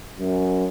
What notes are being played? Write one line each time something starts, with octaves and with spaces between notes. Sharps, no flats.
F#2